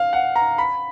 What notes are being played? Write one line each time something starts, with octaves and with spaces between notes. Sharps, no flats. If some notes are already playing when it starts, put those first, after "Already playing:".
Already playing: F5
F#5
A#5
B5